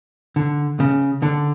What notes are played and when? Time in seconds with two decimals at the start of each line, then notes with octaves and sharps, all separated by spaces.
0.36 D3
0.80 C#3
1.22 D3